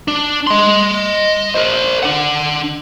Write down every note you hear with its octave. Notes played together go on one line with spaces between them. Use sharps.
D4
D#5 C6
A#4 C5
D4 F#5